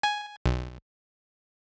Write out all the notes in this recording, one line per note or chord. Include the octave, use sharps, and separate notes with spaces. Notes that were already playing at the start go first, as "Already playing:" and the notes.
G#5 G#6
B1